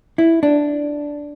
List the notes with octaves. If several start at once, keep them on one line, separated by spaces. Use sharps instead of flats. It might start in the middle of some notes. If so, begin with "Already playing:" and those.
E4
D4